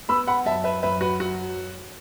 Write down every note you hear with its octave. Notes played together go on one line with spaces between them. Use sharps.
B3 B5 E6
F#5 B5
F#2 E5 A5
B4 E5
F#2 B4 E5
F#4 B4
F#3 F#4